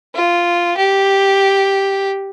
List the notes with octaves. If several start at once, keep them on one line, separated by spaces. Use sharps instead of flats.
F4
G4